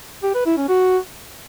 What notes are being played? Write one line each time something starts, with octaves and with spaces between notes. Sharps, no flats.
G4
B4
E4
C#4
F#4